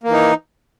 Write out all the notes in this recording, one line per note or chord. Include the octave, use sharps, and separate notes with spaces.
E3 A#3 D#4